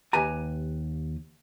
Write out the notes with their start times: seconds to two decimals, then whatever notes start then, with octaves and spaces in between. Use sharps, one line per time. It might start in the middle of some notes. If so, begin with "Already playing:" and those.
0.13 D#2 G4 B4 G#5 A#5